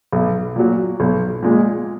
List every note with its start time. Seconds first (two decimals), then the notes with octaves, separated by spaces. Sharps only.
0.13 B1
0.56 A#2 F#3
1.00 B1
1.43 A#2 G#3